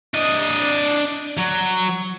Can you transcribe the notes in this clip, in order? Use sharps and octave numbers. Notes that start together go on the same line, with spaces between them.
D4 D#5
F#3